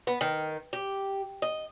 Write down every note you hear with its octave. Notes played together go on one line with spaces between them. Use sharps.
B3
D#3
G4
D#5